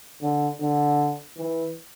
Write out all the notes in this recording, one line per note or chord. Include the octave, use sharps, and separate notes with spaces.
D3
D3
E3